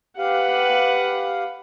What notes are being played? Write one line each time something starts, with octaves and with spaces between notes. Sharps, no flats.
G4 B4 F5 F#5